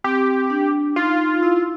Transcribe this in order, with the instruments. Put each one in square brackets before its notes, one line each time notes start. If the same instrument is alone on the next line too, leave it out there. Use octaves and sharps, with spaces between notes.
[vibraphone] C4 [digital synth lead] G4
[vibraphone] D4
[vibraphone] D#4 [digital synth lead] F4
[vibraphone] E4